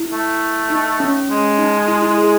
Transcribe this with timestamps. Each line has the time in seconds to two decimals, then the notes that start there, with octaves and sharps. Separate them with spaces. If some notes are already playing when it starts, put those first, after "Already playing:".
Already playing: E4
0.12 A3
0.70 D#4
1.00 C#4
1.29 G#3 C#4
1.58 D#4
1.88 E4
2.02 E4
2.18 G#4